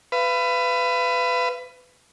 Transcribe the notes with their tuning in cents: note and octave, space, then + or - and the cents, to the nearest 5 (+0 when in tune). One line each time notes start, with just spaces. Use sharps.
B4 +20 F5 -35